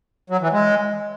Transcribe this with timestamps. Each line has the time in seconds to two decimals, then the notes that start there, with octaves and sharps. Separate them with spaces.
0.30 F#3
0.41 E3
0.52 G#3